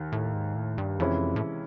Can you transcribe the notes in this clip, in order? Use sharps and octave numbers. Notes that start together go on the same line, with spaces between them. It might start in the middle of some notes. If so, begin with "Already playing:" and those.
Already playing: D#2 D#3
A2
G#2
A2
G2
F2 C3 E3 G#3 C#4 E4
A2